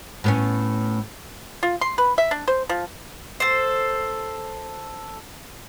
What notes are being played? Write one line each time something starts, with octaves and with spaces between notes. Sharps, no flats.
A2 B3 C#4
F4
C6
B4
E5
D4
C5
F3
A4 C5